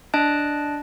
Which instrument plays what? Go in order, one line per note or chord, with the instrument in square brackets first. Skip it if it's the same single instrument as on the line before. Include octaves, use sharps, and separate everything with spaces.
[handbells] D4 D#5 A5 F#6 D7